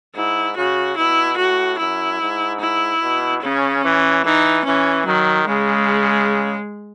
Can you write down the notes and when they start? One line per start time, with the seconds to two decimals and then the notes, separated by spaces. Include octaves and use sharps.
0.16 G#2 E4
0.57 C#3 F#4
0.98 B2 E4
1.39 A2 F#4
1.80 F#2 E4
2.21 G#2
2.61 E4
3.02 B2
3.43 C#3 C#4
3.84 E3
4.25 E3 D#4
4.66 E3 C#4
5.07 D#3 F#3
5.47 C#3 G#3